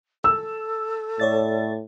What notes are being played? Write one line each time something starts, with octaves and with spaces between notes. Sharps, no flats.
A4 E6
A2 C#5 D5 A6